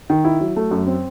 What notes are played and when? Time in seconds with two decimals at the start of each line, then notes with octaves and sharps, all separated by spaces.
0.10 D#3
0.25 E4
0.41 F#3
0.56 A3
0.71 F#2
0.87 C4